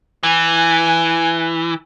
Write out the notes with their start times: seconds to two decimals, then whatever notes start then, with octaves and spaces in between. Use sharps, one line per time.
0.23 E3 G#5